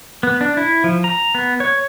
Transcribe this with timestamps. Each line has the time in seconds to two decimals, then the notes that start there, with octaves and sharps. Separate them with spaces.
0.23 B3
0.41 D4
0.57 E4
0.84 F3
1.04 A#5
1.35 B3
1.60 C#5